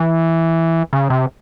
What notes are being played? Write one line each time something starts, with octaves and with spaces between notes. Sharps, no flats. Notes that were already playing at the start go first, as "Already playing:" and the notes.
Already playing: E3
C#3
C3